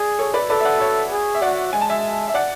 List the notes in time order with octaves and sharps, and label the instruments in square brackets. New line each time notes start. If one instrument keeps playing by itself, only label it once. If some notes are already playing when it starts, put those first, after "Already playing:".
Already playing: [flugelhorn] G#4 [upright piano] D5
[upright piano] A4 C#5
B4 D5
[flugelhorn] A4 [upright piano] B4 D5
[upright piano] E5
D5 F#5
C#5 E5
[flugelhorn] G#4
[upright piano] E5
[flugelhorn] F#4 [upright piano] D5 F#5
[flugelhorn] G#3 [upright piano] G#5
[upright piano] A5
E5 G#5
E5
D5 F#5